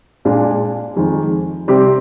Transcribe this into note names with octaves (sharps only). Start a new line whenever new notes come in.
A#2 G#3 D4 F4
F2 D#3 G#3
C3 G3 C4 G4